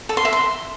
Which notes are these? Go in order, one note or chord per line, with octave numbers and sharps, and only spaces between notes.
A4
C6
E5
C6